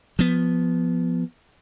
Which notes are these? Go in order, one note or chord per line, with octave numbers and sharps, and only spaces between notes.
F3 B3